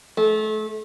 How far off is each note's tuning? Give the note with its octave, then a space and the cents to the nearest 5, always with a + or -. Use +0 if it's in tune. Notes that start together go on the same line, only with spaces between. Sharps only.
A3 -30